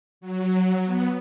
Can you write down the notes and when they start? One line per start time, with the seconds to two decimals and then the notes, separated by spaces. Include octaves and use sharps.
0.21 F#3
0.85 B3